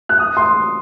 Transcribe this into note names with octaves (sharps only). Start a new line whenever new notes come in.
F#6
D#6
C6